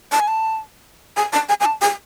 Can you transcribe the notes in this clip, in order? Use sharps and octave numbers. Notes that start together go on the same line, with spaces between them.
A5
G#5
A5
G#5
A5
G#5
G#5
A5
G#5